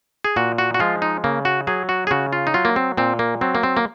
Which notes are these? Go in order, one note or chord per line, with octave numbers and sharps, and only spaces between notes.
G#4
A#2 F#4
F#4
F#4
F3 G#3 F4
D#4
C#3 A#3
F#4
F#3 G#4
F#4
G#4
C#3 F#4
F4
D#4
F#3 F4
A#3
C4
A#2 C4
A#3
F#3 C4
A#3
C4
A#3